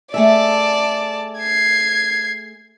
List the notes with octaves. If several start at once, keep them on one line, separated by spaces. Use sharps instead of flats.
A3 G#4 D5 E5 A5
G#6 C7